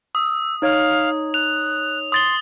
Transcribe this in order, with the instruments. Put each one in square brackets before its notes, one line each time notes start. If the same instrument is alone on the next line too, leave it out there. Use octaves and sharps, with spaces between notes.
[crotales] D#6 [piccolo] E6
[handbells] D#4 C#5 [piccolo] F5
[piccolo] F#6 [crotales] F7
[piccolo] C6 [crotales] D#6 A6 G7